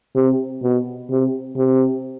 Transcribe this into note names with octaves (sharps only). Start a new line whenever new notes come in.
C3
B2
C3
C3